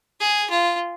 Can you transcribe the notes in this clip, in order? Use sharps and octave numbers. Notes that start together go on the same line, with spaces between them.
G#4
F4